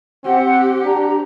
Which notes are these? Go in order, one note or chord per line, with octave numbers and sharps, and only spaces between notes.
C4 G4 F#5
D4 A#5